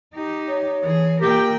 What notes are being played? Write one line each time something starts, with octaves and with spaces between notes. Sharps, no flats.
D#4 G4
C#5
E3 G#4
A#2 G4 A#4 G5